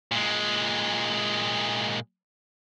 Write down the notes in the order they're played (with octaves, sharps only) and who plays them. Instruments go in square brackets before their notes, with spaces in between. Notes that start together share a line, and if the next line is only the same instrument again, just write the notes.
[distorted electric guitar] A#2 G#3